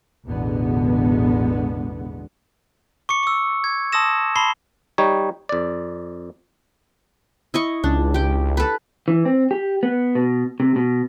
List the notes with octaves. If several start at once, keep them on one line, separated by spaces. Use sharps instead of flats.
A1 E2 B2 D3 G#3 B3
C#6 D6 C#7
C#6 E6
G#6
A5 C6 D#6 E6 A#6 E7
A5 B5 C6 C7 G7
G3 D#4 C#5
F2 D5
E4 D#5 C#6
C#2 D4
G4 G5
A4 B4
E3
C4
G4
B3
B2
C3
B2